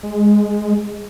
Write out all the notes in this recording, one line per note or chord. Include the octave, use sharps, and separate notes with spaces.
G#3